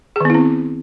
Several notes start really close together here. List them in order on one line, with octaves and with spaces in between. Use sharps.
G#4 D#3 B3 E4 C4